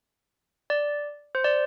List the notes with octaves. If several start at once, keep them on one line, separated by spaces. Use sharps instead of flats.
D5
C5
D5